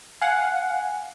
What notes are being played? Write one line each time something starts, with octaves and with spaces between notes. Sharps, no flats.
F5 F#5 G#5